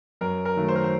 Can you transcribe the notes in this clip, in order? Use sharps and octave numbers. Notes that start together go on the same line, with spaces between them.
F#2 A#4
A#4
D#3 F#3 A3
C5
A#4
C5